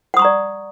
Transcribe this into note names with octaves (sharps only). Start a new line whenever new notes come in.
D5 F#5 A#5 C#6 D#6